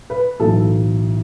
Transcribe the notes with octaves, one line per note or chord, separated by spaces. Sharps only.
B4
B1 A2 E3 A4